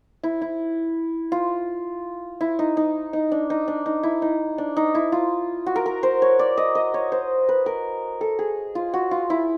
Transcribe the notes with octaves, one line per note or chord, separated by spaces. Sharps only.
E4
E4
F4
E4
D#4
D#4
D#4
D4
D#4
D4
D#4
E4
D#4
D4
D#4
E4
F4
F#4
A#4
A#4
C5
C#5
D5
D#5
D#5
C#5
C5
B4
A#4
A4
G#4
F4
F#4
F4
E4